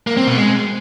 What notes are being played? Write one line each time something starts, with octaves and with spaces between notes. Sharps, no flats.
A#3
C4
B2
G#3